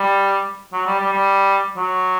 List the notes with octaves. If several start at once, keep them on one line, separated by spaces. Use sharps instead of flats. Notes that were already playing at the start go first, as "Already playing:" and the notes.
Already playing: G3
F#3
G3
G3
G3
F#3